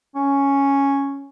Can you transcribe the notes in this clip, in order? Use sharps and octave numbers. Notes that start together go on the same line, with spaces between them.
C#4